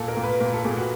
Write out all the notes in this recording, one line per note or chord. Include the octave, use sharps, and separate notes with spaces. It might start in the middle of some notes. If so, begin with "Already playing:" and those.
Already playing: A#2 A4
A#4
A#2
B4
A#2 A#4
A4
A#2 G#4
F#4